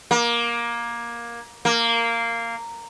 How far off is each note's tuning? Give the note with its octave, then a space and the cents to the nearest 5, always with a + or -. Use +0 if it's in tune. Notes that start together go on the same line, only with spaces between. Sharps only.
A#3 +15
A#3 -10